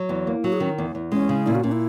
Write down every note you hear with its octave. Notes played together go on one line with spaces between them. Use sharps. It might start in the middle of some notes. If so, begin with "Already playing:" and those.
Already playing: F#3
E2
A#3
F#3 F#4
G#4
D#3 C#4
E2
E2
G#3 C#4
C#3
A#2 E4
F#4
A#2 C#4
E4